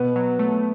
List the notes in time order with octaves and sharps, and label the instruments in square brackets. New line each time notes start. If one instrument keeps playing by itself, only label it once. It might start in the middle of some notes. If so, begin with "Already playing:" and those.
Already playing: [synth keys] B2 [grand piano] B3
[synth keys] F#3
A3